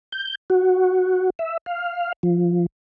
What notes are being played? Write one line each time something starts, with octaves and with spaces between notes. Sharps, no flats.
G6
F#4
E5
F5
F3